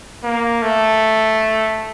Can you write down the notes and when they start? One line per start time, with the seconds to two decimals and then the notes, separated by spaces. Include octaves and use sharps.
0.23 A#3
0.62 A3